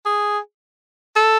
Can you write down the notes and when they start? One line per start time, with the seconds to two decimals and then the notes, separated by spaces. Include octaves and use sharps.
0.06 G#4
1.16 A4